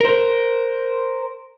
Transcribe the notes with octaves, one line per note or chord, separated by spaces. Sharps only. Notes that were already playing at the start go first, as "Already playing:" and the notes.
A#4 C5